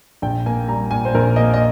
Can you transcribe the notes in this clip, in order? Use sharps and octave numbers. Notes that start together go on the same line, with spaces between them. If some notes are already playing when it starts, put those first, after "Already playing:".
A#1 G5
A#3 G#5
G3 A#5
A#2 G#5
C5
A#1 A#4
A#3 D#5
D#5